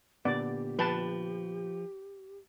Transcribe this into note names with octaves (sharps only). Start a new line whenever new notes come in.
A#2 D3 B3 G4 D5
F3 B4 G5 A5